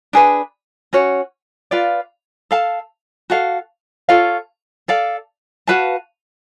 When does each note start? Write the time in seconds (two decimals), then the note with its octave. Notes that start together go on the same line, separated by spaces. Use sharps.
0.13 D4 G#4 B4
0.93 C#4 F#4 C#5
1.71 F4 B4 D5 F5
2.51 A4 F5 A5
3.30 F#4 A4 F5
4.09 F4 A4 C#5 F5
4.88 A4 D5 F5
5.67 F#4 B4 F5 A5